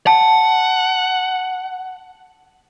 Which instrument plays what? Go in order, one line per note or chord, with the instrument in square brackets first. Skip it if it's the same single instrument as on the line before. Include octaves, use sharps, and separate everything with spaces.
[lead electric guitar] F#5 [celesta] A5